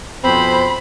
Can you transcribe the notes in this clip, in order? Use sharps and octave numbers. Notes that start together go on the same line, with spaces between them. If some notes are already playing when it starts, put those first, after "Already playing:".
F2 B2 C4 C5 B5